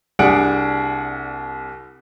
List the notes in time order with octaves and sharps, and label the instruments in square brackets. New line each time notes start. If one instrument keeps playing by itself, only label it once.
[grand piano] C2 G3 D4 G#4 F#5 D7